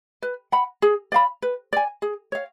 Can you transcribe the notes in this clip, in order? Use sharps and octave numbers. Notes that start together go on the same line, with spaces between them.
B4
F#5 B5
G#4
D5 F5 B5
B4
D5 G#5
G#4
C#5 F5